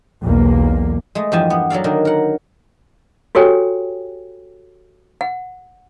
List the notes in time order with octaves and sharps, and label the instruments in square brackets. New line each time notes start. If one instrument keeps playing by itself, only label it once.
[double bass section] B1 E2 A#3
[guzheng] G#3 A3
E2 G2 F3 G4 G#5 A5
B3
F#3 A4 D5 F5
D3 D#3 A#3 D4 A#4
A#4 F#5
[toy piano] F#4 G4 A4 C#5 G5 G#5
F#5